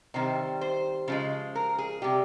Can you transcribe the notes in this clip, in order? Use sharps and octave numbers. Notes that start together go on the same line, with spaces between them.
C3 D#3 G3 C5
C5
C#3 F3 G#3
A#4
G#4
C3 G3 G4